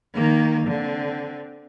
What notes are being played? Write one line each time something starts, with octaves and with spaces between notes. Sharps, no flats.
D#3 A#3
D3 C4